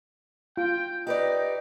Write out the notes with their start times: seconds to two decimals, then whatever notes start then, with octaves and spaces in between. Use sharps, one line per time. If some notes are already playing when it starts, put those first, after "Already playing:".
0.57 F4 G5
1.07 D#4 G4 B4 D5 D#5